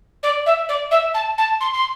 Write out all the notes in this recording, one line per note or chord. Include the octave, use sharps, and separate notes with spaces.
D5
E5
D5
E5
A5
A5
C6
C6